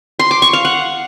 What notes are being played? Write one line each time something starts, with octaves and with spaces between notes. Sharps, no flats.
C6
D6
C#6
F5
F#5